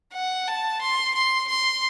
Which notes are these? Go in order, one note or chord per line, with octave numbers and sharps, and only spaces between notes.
F#5
A5
C6
C6
C6